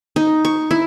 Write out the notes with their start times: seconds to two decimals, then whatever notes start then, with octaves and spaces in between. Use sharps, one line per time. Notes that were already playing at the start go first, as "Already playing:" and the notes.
0.16 D#4
0.45 C#6
0.71 E4